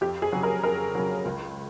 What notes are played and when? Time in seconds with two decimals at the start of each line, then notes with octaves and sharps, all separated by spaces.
0.01 F2 G4
0.22 G#4
0.33 C#3 F#3
0.43 A#4
0.64 F2 A#4
0.95 C#3 F#3
1.25 C#2